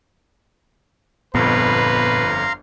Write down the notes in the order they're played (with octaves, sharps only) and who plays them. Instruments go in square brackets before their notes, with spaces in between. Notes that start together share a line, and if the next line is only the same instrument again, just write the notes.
[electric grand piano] G1 F2 [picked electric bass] A#2 B3 [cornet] B4 [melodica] F5 A#5 C6